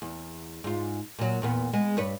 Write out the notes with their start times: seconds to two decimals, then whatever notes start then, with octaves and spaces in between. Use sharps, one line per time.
0.02 E2
0.64 G#2 F4
1.19 A#2 F#3
1.42 E2 A#2 B3
1.73 G#3 B3
1.97 G2 B4 C#5